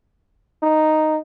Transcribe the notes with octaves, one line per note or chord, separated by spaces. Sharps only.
D#4